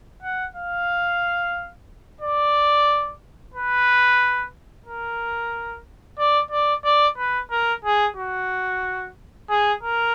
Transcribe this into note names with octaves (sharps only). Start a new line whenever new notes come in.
F#5
F5
D5
B4
A#4
D5
D5
D5
B4
A#4
G#4
F#4
G#4
A#4